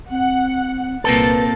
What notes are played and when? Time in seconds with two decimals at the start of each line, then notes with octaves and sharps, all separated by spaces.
0.11 C4 F#5
1.04 C2 A#2 A#3 C4 A4 B4 A6